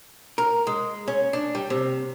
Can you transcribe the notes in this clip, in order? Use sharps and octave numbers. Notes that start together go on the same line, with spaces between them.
A#4
G#3
C#4
D4
G3
C3